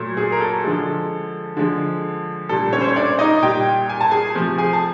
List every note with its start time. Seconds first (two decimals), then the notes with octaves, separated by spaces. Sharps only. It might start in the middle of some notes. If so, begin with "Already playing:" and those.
Already playing: A#2 F#3 A3
0.17 G#4
0.32 A#4
0.41 A4
0.64 D3 F3 G#3
1.57 D3 F3 G#3
2.49 A#2 G3 A4
2.73 C#4 C#5
2.81 C5
2.88 C#5
2.96 D4 D5
3.19 D#4 D#5
3.42 A#2 G3 G4 G5
3.89 G#5
4.01 A5
4.11 G#4 G#5
4.35 C3 F3 A3
4.58 G#4 G#5
4.73 A5